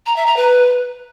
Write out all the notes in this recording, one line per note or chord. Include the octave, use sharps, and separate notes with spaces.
A#5
E5
A#5
B4